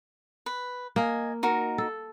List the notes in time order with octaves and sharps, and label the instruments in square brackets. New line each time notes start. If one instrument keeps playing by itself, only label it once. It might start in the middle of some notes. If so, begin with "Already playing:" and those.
[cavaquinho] B4
[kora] A#3 [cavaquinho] D#5 G#5
[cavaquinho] D#4 F#4 A#4
[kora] A4